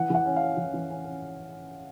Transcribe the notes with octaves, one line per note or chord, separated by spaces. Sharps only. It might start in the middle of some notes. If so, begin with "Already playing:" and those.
Already playing: E3 F#5
E3 F#5
C#4
F5
C#4
E3
E3
C#4
C#4